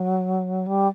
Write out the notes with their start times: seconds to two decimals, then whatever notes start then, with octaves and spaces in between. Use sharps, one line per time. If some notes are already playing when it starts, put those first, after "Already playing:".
Already playing: F#3
0.67 G3